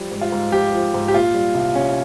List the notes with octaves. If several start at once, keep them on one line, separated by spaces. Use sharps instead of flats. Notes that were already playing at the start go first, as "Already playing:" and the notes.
Already playing: F3 G3
G#2
F4
G#2
F3 G4
F3
G#2
G4
A#2 F4
G3
C2
C2 C#4